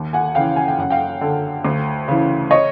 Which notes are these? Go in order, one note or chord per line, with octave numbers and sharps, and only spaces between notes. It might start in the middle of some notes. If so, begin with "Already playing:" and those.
Already playing: D#2
F#5 G#5
C#3 E3 F5 G5
G#5
G5
F#2 F#5
F5 G5
D3
D2
C#3 E3
C#5 D#5